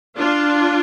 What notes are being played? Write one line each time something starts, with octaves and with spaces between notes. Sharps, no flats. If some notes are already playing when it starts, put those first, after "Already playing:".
D4 F4